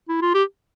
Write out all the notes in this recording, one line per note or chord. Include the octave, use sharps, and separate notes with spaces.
E4
F4
G4